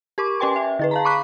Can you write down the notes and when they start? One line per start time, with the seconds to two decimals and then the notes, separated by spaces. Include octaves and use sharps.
0.18 G4 A#4 C#6 D6
0.40 C#4 G4 B4 G5 G#5 C6
0.56 E5
0.79 D3 G#4 B4
0.91 F5 A5 A#5
1.05 B5 C#6 D6 F#6 B6